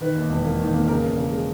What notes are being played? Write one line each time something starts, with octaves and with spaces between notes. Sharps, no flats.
D#3 B4
D#2
E1
A#3
D#3
A#3
C#3 A#4
E1
C#3
G#3